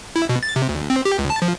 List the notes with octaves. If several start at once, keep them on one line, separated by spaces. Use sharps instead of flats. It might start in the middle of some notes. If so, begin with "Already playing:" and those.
E4
B2
A6
C3
D2
C4
G4
C#2
A5
F3